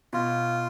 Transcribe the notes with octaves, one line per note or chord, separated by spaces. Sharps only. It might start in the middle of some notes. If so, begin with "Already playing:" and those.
B2 F4